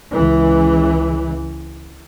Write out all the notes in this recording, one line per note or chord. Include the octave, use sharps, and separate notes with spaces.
C#2 E3